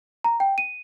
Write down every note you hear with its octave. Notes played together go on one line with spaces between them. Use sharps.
A#5
G5
D#7